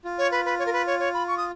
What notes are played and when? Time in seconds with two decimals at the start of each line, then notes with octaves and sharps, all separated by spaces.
0.04 F4
0.18 C#5
0.31 B4
0.45 B4
0.59 C#5
0.66 A#4
0.73 B4
0.87 C#5
0.99 C#5
1.14 B5
1.27 C#6
1.37 D#6